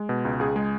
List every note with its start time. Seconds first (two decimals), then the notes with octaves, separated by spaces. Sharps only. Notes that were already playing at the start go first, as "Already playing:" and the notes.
Already playing: G#3
0.09 B2
0.25 C#2
0.39 C#2 G#4
0.56 G#3